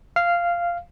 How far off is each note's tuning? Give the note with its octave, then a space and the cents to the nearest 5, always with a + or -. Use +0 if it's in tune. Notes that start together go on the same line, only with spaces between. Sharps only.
F5 -10